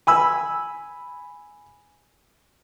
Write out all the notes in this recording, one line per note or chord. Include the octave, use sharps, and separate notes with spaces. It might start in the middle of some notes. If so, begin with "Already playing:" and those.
G#5 B5 E6